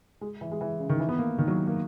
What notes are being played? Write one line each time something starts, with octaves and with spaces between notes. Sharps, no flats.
G#3
E3
G#3
E3
C#3
D#3
E3
B3
A#3
D#3
F#3
A#3